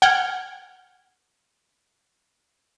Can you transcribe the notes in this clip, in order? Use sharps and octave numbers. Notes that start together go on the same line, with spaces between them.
F#5 G5 F6 G#6